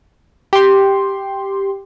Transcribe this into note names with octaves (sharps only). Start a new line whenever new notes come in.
G4 C6